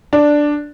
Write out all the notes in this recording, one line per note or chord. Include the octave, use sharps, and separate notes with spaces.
D4